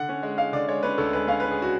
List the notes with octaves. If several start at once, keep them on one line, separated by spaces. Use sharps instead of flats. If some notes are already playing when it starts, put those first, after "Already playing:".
Already playing: D3 F#5
C#4
G#3
G#3 F5
D3 D5
G#3 C#5
C#4 B4
D2 A4
G#3 B4
C#4 F5
C#4 B4
G#4
F#4